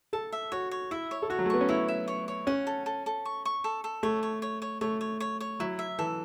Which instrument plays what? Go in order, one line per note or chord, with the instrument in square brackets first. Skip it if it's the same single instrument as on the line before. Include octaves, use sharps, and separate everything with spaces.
[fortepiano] A4 [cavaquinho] A5
[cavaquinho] E5
[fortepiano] F#4 [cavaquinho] C#5
[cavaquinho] C#5
[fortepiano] E4 [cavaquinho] E5
[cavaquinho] C#5
[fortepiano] A4
[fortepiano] F#4 [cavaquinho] C#5
[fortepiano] F#3
A3
[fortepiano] B3 [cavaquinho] C#6
[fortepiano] C#4
[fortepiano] E4 [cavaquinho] C#5
[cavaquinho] E5
C#5
C#5
[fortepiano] C#4 [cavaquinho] F#5
[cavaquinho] A4
A4
A4
C#6
C#6
A4
A4
[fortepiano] A3 [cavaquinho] C#5
[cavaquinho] C#5
C#5
C#5
[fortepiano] A3 [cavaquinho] C#5
[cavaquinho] C#5
C#5
C#5
[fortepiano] F#3 [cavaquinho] E4
[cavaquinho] E5
[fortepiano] E3 [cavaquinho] A4